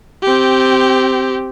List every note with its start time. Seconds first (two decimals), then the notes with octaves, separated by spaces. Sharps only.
0.23 C4 G4